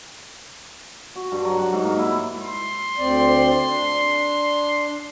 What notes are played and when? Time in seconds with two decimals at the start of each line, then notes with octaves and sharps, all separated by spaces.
1.16 F#4
1.32 G2
1.45 F#3
1.58 F#5
1.73 G#2
1.85 A#3
1.99 E4
2.43 C6
2.98 D2 C4 D5
3.66 D4